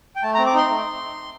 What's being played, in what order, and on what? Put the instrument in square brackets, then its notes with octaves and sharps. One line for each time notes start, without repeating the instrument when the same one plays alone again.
[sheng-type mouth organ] G5
A3 A5
A#5
C4
D6
D#4 C6
A3